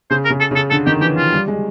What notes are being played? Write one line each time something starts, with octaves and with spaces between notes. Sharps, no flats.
C#3 C5
A#4
C#3
A4
C#3 A4
D3 A4
D#3 G4
E3 G4
F3 F4
G3
G#3